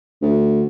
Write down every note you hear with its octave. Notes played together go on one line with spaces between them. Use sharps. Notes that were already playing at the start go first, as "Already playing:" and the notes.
D2